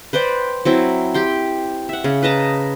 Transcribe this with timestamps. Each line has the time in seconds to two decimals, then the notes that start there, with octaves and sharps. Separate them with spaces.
0.13 B4 C5 D5 G5
0.65 F#3 C4 E4
1.14 G4 G5 C6
1.89 E5 F#5
2.04 C#3
2.23 B4 D#5 A5 A#5